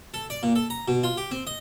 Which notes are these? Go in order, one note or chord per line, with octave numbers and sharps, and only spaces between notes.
A4
D5
A#2
A4
A#5
B2
F4
G4
C4
D#5